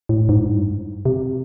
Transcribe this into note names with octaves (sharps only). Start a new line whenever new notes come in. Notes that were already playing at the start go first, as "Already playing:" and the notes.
A2
G#2
G2
C3